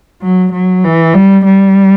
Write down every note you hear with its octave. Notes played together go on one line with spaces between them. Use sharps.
F#3
F#3
E3
G3
G3